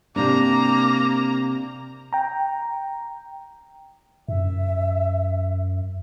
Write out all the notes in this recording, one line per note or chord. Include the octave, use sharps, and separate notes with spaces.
C3 A#3 D4 A#5 D6
G5 A#5
F#2 E5